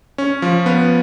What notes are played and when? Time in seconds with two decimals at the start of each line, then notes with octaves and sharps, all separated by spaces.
0.18 C#4
0.42 F3
0.66 B3